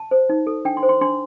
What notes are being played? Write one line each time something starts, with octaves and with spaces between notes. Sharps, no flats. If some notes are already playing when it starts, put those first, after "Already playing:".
Already playing: A5
C5
D#4
A4
D4 G5
C6
C5
C6
D4 C6